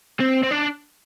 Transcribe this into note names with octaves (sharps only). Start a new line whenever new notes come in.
C4
C4
D4